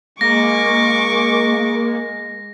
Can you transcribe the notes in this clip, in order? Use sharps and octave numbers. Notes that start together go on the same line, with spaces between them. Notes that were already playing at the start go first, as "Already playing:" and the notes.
G#3 A#3 C#6 D6 A#6